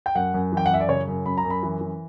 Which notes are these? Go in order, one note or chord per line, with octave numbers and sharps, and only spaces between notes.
G5
F#2 F#5
F#2
E3 G5
F#5
F#2 E5
D5
C#3 C#5
F#2
F#2 B5
A#5
F#2
B5
E3
E3